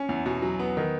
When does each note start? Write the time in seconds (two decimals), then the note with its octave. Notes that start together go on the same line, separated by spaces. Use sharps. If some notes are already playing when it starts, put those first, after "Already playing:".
Already playing: C#4
0.09 E2
0.26 B2
0.42 F#3
0.59 B3
0.77 D#3